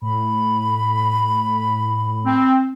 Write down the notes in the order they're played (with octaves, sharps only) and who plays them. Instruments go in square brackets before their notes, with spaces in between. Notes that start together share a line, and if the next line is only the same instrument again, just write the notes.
[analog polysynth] A2 [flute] B5
[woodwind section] C4